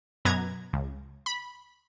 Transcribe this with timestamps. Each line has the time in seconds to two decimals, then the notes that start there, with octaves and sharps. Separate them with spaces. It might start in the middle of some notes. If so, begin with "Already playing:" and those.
0.25 F#2 B2 B3 A#5 G#6
0.73 C#2
1.26 B5